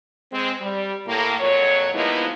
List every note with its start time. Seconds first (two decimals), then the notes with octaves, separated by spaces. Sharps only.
0.32 G#3 C4
0.61 G3
1.06 A2 A#3
1.40 F2 A#2 F#3 C#5
1.94 F3 G#3 A#3 B3 D#4 E4